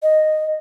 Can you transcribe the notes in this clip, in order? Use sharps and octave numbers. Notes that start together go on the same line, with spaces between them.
D#5